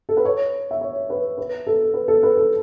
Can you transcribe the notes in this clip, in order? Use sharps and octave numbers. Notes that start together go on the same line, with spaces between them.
A4
B4
C#5
E5
C#5
B4
B4
A4
B4
A4
B4
A4